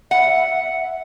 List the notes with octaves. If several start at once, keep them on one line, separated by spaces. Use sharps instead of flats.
E5 F#5